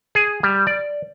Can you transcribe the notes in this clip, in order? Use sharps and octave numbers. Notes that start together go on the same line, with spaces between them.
G#4
G3
D5